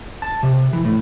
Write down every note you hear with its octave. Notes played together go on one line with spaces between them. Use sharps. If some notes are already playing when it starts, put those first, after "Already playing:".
A5
C3
E3
A2